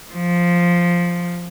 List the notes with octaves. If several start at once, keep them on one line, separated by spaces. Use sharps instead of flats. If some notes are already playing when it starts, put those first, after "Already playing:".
F3